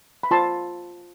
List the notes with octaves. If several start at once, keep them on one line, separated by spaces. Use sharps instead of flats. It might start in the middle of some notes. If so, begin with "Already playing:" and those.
B5
F4 C5 A5 C6